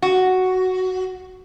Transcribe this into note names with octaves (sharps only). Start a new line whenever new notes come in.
F#4